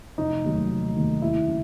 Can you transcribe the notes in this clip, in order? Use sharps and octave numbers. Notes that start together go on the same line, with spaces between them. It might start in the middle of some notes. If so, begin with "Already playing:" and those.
F1 D#4
D#2 D#3 F#3 A3
F1
D#2 D#3 F#3 A3
D#2 E4
C#3